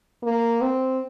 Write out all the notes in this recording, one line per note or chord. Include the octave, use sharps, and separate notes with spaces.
A#3
C4